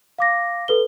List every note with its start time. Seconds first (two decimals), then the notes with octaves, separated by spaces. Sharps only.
0.19 F5 D6 A#6
0.68 A4 B4 G7